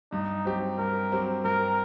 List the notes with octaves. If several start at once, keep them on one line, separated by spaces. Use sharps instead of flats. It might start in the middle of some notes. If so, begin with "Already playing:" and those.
G2 D#4
F#3 C4 G4
G2 A#4
F#3 C4 G4
G2 A#4